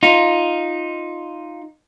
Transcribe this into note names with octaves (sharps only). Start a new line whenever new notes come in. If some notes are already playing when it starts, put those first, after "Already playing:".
D#4 F4